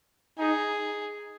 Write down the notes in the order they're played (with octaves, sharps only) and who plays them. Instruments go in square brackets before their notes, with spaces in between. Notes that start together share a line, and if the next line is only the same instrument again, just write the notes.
[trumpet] D#4 [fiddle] G#4